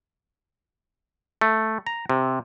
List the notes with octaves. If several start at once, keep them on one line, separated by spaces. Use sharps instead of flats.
A3
A#5
C3